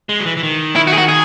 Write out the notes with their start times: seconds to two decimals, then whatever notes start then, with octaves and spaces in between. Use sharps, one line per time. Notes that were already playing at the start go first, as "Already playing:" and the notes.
0.09 G#3
0.20 F#3
0.25 E3
0.37 E3
0.43 D#3
0.76 E4
0.87 F#4
0.93 G#4
0.98 F#4
1.09 G#4